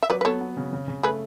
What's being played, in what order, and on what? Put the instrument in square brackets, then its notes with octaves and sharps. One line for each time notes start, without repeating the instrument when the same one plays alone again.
[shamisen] E5
[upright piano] F#3 [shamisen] B4 D5
[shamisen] B4
[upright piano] B3 [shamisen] A4 C#5
[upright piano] B3
C#3
C#3
C#3
[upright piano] A3 [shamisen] G#4 B4